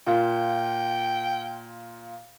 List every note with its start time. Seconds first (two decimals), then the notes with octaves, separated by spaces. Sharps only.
0.07 A#2 F4 G5